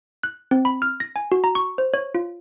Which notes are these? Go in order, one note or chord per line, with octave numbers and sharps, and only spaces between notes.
F#6
C4
B5
F6
A#6
G#5
F#4
A#5
C#6
C5
C#5
F4